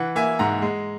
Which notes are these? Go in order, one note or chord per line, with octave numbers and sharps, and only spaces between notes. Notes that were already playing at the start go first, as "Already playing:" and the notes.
Already playing: E3 F#5
A#3 E5 G#5
G#2 F#5 A#5
G#3